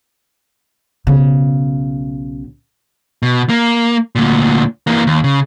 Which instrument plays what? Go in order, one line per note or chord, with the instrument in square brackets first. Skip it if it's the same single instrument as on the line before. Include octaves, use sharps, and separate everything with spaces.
[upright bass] B1 C#3
[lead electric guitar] B2
A#3
D2 A#2
E3 A#3
D#2
C#3